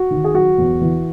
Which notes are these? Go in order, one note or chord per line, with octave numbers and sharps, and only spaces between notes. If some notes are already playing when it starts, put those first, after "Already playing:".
Already playing: F#4
D#3
G#4
F#3 F#4
E2
E3